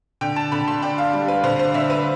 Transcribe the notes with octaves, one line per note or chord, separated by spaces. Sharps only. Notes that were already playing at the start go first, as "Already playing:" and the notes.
D3 G5
A5
D3 B5
C6
D4 G5
F5
G3
B4
D3 C5
C5
D3 E5
B4